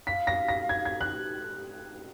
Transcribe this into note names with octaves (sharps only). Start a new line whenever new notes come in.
F5 B6
A#6
A#6
G#6
G#6
F#6